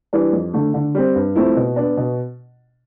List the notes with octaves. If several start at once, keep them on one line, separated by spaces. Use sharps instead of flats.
E3 G3 D4
F2
D3 A3
D3
G3 C4
G2
F3 A3 C4 E4
B2
B3 D4
B2